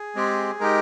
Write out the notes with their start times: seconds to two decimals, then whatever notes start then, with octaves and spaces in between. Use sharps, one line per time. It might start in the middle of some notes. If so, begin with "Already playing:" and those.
Already playing: G#4
0.16 G#3 C4 G4
0.60 G#3 D#4 G4 A#4